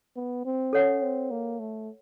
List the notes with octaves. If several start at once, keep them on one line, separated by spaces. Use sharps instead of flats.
B3
C4
C#4 A4 C#5 F#5
C4
A#3
A3